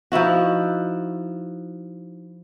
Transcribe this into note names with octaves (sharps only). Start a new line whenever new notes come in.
F3 D#4 E4 F#4